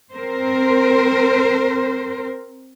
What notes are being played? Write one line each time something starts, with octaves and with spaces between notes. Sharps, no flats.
C4 A#4 C5